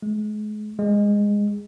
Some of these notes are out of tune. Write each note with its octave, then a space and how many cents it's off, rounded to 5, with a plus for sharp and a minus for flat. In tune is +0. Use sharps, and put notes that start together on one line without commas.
G#3 +35
G#3 -15